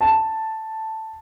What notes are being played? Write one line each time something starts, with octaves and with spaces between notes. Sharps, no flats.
A5